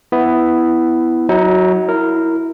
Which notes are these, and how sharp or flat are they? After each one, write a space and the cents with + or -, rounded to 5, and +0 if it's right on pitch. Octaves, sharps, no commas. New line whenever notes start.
B3 +10 E4 +0
F#3 +0 D#4 +40
E4 +0 A#4 -10